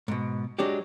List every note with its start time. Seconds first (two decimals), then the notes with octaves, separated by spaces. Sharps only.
0.08 G#2 B2
0.59 F#3 G#3 D4 G4